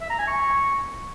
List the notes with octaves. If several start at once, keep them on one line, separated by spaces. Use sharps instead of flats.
E5
A#5
G#5
C#6